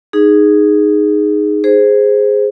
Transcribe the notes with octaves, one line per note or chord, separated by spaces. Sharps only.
D#4 G#4
G#4 C5